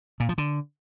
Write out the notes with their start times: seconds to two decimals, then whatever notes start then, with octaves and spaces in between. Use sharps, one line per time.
0.20 A#2
0.29 F3
0.38 D3